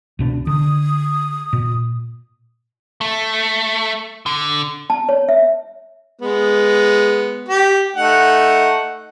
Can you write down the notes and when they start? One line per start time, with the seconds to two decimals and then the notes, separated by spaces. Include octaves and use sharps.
0.19 C#2 B2 D4
0.47 D3 D#6
1.53 A#2
3.01 A3
4.26 D3
4.90 A5
5.09 C#5
5.29 E5
6.21 G#3 B3
7.49 G4
7.96 A3 D#4 F#5